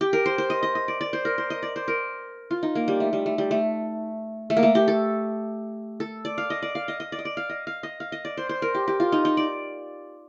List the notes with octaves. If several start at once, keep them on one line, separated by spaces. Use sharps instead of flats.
G4
A#4
C5
C5
D#5
D#5
D#5
D5
D5
C5
A#4
C5
D#5
D5
C5
A#4
F4
D#4
A#3
G3
A3
G3
A3
G3
A3
A3
A#3
A3
G4
A4
A4
D5
F5
D#5
D5
F5
D#5
D#5
D5
D#5
D5
F5
D#5
F5
D#5
F5
D#5
D5
C5
C5
A#4
G4
G4
F4
D#4
D#4
D5